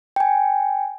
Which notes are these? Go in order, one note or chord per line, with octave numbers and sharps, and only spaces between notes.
G5 G#5